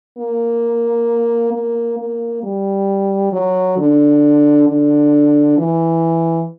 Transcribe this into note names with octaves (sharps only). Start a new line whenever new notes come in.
A#3
A#3
A#3
G3
F#3
D3
D3
E3